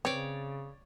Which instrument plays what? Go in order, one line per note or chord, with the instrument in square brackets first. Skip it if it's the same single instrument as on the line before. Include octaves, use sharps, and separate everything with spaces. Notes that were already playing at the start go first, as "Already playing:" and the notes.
[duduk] C#3 [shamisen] C4 B4 [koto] C#5 D5